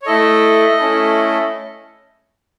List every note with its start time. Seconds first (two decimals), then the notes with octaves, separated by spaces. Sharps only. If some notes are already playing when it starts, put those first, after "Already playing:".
0.02 C#5
0.06 A3 E4 A4 D#5
0.79 A3 C#4 E4 A4